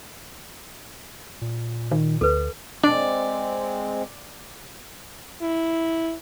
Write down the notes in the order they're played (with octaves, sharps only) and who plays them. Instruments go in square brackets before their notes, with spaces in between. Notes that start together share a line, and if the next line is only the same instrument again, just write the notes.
[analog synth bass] A#2
[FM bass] D#3
[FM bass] D2 [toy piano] A4 B4
[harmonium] G#3 C4 [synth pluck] D4 [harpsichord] D5
[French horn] E4